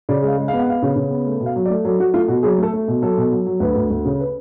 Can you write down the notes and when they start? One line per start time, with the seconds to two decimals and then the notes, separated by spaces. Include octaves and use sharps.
0.09 C#3 D5
0.22 G#3
0.28 F5
0.38 G#3
0.48 B3 F5
0.59 F#5
0.67 B3 F5
0.82 C#3
0.96 C#3
1.11 B3
1.26 A3
1.40 B2
1.46 F5
1.56 F#3
1.66 D5
1.70 A3
1.85 F#3 A4
1.99 F#3 F#4
2.13 A3 F4
2.28 B2 F#4
2.43 F#3 G#4
2.58 A3 A4
2.73 A3
2.88 B2
3.02 F#3 A4
3.17 B2
3.32 F#3
3.46 F#3
3.60 D2 B4
3.76 D2
3.90 D2
4.05 C#3
4.20 B4